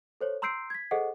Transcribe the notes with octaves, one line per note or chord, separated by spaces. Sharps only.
A4 C5 C#5
A#5 C6 E6 G6 C7 D7
G#6 B6
G#4 A4 C5 D#5 F#5